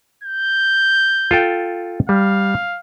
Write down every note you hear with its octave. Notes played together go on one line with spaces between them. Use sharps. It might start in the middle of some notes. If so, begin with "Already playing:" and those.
G6
F4 A4 G5
G3 F5